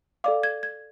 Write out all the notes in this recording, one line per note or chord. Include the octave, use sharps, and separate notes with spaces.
A4 D5 F5 D6
G#6
G#6